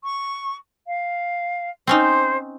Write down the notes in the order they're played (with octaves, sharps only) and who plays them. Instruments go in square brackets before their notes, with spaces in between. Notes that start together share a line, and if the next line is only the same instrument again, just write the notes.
[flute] C#6
F5
[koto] C4 C#4 D#4 [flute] C5